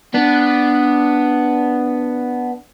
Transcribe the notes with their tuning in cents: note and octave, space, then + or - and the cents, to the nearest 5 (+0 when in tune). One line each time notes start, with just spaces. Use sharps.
B3 +0 D4 +0